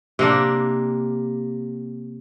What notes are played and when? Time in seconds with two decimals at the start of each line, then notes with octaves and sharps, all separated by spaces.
0.19 C3 A#3 D4